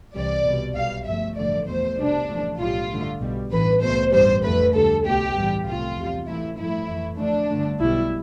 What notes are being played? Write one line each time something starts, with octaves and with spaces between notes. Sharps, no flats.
C2 C3 E3 G3 D5
C2 B2 G3
B1 B2 G3 F5
G1 G2 F3 A3 E5
A1 G2 D3 F3 A3 D5
E2 B2 A3 C5
C2 B2 G3 D4
A1 A2 F3 A3
B1 A2 G3 F4
G2 D3 A3
B1 B2 G3
A1 G2 E3 B4
C2 B2 A3 C5
A1 G2 E3 G3 C5
F2 D3 F3 A3 B4
D2 D3 G3 A4
C2 B2 A3 G4
A1 G2 E3 G3
C2 C3 F3 A3 F4
E2 C3 G3
A1 A2 E3 A3 E4
G2 F3 A3 E4
F2 E3 A3
F2 D3 A3 D4
G2 D3 A3
B1 B2 G3 E4